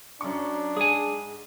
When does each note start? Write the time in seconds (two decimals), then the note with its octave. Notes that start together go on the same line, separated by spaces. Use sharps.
0.21 F#2 D4 C#6
0.77 G#2 G#4 G#5